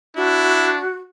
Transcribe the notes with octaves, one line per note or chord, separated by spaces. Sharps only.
D4 E4 F#4